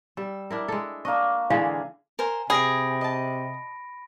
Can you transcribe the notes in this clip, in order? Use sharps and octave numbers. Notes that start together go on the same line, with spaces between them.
G3 E6
D4 E4 A#4
G#3 A4
A#3 D4 D#5 C#6
D3 E3 G#3 G#4 F5
A#4 C5 G#5
C3 G#4 G#5 B5 A#6 D7
D#5 A5